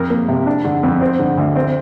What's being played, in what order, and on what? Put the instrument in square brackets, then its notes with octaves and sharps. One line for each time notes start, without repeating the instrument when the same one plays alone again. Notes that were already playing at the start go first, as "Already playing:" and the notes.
Already playing: [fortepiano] F2 A#4
A#3
C3
D4
D3
F2
C4
D3
D2
C4